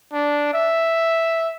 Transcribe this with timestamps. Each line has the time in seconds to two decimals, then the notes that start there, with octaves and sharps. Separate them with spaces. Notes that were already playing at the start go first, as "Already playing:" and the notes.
0.13 D4
0.53 E5